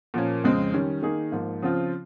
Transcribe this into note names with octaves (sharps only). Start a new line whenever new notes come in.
A#2 F3 A#3 C#4
F2 C#3 G#3 C4
D#3 G3 C#4
D#3 A#3 D#4 G#4
G#2 F3 A#3
C#3 F3 C4 F4